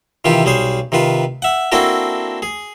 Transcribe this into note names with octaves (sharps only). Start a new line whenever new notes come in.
C3 D#3 E3 F4 G4
B1 G3 G#4 C5
C3 D#3 F4 B4
E5 F#5
A#3 C4 D4 E4 F#4 A4
G#4